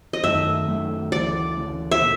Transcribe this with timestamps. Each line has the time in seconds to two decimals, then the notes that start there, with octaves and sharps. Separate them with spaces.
0.13 D#5
0.23 F#2 D#3 F#3 A3 E5
0.67 F#2 D#3 F#3 A3
1.12 D2 C#3 E3 D5
1.57 D2 C#3 E3
1.91 E5
2.01 A#2